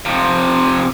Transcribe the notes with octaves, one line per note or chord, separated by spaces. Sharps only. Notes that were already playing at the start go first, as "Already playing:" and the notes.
C3 F3